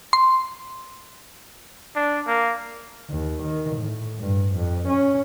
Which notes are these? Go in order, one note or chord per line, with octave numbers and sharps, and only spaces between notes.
C6
D4
A#3
D#2
D#3
A2
G2
F2
C#4